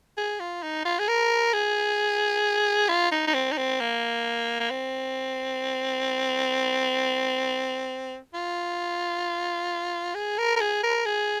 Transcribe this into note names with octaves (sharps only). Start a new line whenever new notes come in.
G#4
F4
D#4
F4
G#4
A#4
G#4
F4
D#4
D#4
C4
D#4
C4
A#3
A#3
C4
F4
G#4
A#4
A#4
G#4
A#4
G#4